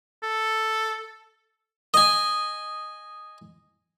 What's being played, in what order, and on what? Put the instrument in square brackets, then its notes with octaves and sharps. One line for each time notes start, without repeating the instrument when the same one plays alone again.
[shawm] A4
[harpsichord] D#5 G#5